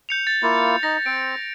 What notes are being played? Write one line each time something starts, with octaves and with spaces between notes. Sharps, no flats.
G6 C#7 F7
A6
A#3 E4 F4
D#4 A#6
C4 C5 D7